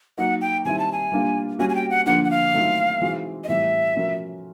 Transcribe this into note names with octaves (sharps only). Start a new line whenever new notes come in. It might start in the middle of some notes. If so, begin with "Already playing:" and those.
F#3 A#3 D#4 F#5
G5
D#3 G3 C4 E4 G#5
A5
G#5
G3 A#3 D4 F4
G3 A#3 C#4 F#4 G#5
G#5
G5
F#5
D3 F3 A#3 D4 F#5
F#5
F5
D#3 F#3 A3 C4 F4
E3 G#3 C4 D#4 F#4
D#5
A2 E3 G3 C4 E5
F3 A3 C#4 F#4 A#4